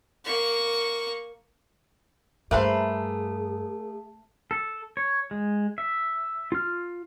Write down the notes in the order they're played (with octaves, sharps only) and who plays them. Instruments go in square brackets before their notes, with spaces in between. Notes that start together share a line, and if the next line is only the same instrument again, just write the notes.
[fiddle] A#3 C#6
[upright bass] G2 [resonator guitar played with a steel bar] A3 [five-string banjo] A#3 B4 C5 [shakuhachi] G#4
[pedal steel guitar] A4
C#5
G#3
E5
F4 F6